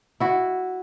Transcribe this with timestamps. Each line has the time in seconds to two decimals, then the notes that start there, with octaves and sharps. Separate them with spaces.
0.20 E4 F#4